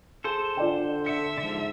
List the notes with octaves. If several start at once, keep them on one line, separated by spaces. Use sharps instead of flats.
G#4 A4 C5
D3 F4 D5 G5
E5 C#7
G#2 D3 F3